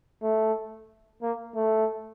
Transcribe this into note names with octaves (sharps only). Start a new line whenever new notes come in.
A3
A#3
A3